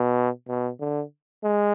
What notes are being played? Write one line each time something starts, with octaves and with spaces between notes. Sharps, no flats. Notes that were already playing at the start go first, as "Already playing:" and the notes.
Already playing: B2
B2
D3
G#3